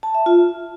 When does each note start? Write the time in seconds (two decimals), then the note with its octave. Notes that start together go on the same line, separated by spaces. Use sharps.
0.03 A5
0.15 E5
0.26 F4